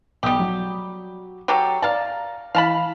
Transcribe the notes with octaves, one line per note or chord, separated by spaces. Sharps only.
B1 G3 G4 D#6
F#3
F#3 G4 A4
D5 F5 A5 A#5
E3 F5 A5 B5